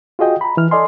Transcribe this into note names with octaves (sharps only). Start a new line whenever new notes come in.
F4 F#4 G#4 D#5 G5
A#5 B5
E3 F6
A4 D5 D#5 G#5 C6